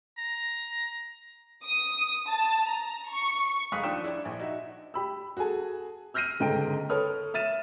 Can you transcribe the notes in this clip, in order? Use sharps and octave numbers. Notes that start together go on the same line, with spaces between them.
A#5
D#6
A5
A#5
C#6
F1 G#3 F5 D#6 F#6 B6
D#2 F3 D4 G5 D#6 E7
D4 E4 D5
A#1
D#4 F#4 E5
G4 B5 E6
F#4 G#4 A4 G#5 A5
E6 F6 G6 A#6 C7 D#7
G1 G#2 C#3 A4 G5 D7
A4 B4 C#5 D#6 F6
E5 F6 A6 D#7 E7